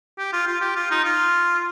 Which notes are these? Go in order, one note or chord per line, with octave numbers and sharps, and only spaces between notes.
G4
F4
F4
G4
F4
D#4
F4